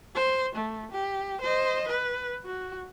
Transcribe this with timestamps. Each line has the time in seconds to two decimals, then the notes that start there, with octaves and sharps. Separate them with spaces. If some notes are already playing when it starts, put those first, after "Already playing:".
0.15 C5
0.55 A3
0.92 G4
1.41 C5 D#5
1.88 B4
2.46 F#4